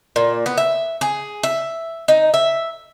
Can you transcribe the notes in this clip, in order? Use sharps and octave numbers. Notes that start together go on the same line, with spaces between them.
A#2
B3
E5
G#4
E5
D#4
E5